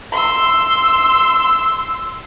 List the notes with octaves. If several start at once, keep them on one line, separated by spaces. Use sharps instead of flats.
C6 E6